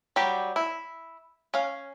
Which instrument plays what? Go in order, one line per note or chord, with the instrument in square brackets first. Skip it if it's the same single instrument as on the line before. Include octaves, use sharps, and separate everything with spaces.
[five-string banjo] F#3 G3 G4
E4
C#4 F5